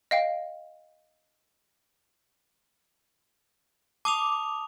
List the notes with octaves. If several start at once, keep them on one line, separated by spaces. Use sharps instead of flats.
D#5 F5 G5
A5 D6 D#6 F7